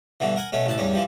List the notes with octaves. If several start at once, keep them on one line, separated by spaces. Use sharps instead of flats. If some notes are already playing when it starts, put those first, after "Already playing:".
G2 B2 D3 E3
A#4 F#5 G#5
B2 A3 C#4
A1 D2 E4 A5
E2 G2 G3 C#4
E3 F3 G3